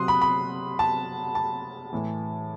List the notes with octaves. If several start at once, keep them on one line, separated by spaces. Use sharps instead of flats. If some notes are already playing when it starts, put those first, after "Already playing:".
Already playing: C3 F#3 C6 D#6 F#6
B5
B5
A5
A5
A2 E3